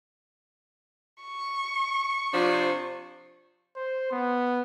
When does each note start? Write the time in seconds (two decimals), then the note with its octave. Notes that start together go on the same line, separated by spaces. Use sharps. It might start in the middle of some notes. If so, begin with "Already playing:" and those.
1.22 C#6
2.32 C3 F3 D4
3.76 C5
4.11 B3